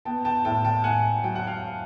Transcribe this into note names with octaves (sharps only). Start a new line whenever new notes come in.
B3 G5 A5
G5 A5
A2 G5 A5
G5 A5
A2 F#5 G#5
F#3 G5
F#5
F5 G5